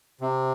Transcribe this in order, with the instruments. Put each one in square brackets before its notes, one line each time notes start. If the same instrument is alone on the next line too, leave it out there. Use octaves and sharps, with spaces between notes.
[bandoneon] C3